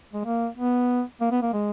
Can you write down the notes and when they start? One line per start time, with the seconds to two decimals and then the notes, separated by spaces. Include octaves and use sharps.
0.13 G#3
0.25 A#3
0.57 B3
1.21 A#3
1.31 B3
1.42 A#3
1.53 G#3